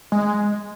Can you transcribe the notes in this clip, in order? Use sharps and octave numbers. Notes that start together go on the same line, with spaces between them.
G#3